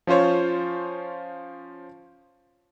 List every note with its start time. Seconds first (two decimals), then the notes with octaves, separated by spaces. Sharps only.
0.07 F3 C#4 F4 C5 C#5